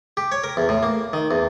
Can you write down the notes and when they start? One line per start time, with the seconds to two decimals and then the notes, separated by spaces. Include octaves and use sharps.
0.17 G4
0.32 C#5
0.44 A#4
0.57 E2
0.69 A2
0.83 A#3
1.13 D#3
1.31 E2